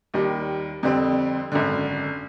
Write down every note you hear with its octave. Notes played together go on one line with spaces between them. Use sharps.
D#2 D#3 G3
F2 D3 G3 C4
G#1 F#2 D3